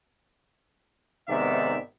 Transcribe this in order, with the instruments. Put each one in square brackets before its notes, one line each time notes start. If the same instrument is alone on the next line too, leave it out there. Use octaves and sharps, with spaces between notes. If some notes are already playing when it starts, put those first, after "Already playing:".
[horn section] G#2 C3 D#3 B3 D5 E5